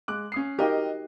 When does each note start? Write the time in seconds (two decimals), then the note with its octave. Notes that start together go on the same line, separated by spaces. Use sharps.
0.08 G#3 D6 F#6
0.32 C#4 D#6 C7
0.59 D#4 F#4 G4 A#4 D#5 G5